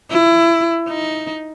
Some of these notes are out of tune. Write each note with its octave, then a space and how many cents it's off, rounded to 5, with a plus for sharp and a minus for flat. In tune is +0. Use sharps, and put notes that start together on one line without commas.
E4 +25
D#4 +10